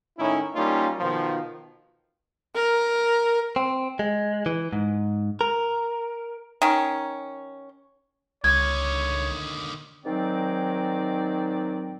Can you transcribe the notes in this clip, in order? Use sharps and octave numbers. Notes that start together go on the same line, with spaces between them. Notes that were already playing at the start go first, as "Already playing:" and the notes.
A2 D#3 C#4 D#4 E4
G3 A#3 C#4 D#4 F4
B2 D#3 F3
A#4
C4
G#3
E3
G#2
A#4
D#3 C#4
C#2 D3 D#3 C#5 G#6
G#2 D#3 F#3 C4 D5 G5